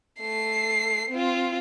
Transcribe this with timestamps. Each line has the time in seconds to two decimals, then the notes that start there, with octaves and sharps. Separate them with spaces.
0.21 A3 C7
1.10 C4 F4